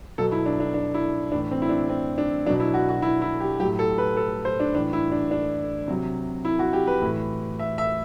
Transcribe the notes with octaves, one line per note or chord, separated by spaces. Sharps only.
B2 F#3 A4
E4
D4
D4
D4
E4
A2 E3 D4
C4
E4
D4
C4
D4
B2 F#3 D4
E4
F#4
F#4
E4
E4
G4
A2 F#3 G4
A4
B4
A4
C5
D4
A2 E3 D4
E4
D4
D4
C3 F#3
E4
F#4
G4
B4
A2 E3
E5
E5